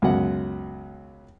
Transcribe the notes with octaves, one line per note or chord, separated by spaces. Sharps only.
C#2 F#2 B2 F#5